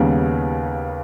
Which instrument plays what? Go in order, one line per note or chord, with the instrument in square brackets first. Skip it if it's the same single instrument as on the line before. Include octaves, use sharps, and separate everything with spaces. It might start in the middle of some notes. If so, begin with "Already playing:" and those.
Already playing: [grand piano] D#2 C#3 G3 B3 D#4